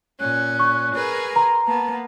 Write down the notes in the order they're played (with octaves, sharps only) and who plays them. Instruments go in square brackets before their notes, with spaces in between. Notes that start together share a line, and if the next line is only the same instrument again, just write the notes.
[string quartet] A#2 C#4 [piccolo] F#6
[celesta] C#6
[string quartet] G#4 A#4 B4
[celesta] A#5 [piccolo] C6
[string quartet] A#3 B3 [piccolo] A5